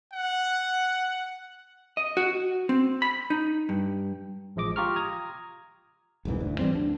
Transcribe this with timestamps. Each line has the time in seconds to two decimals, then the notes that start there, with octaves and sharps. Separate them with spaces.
0.13 F#5
1.97 D#5
2.17 F#4
2.69 C4
3.02 B5
3.30 D#4
3.69 G2
4.56 A1 F3 G#3 D#5 D6
4.76 F4 G4 A#5 C#6 F6
4.96 A#5 D#6 G#6
6.25 E1 C2 G#2 E3
6.40 D2 G#2
6.59 E3 G3 C4
6.75 D2 D4